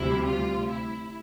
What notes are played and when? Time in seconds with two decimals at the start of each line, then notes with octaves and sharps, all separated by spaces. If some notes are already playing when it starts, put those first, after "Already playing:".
Already playing: D2 C3 G3 E4
0.25 F4
0.67 E4